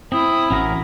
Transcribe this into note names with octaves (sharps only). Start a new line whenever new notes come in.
C4 E4 D#6
A1 C#4 F#4 A#4